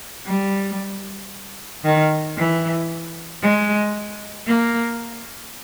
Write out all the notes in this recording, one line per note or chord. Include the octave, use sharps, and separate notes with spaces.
G3
D#3
E3
G#3
A#3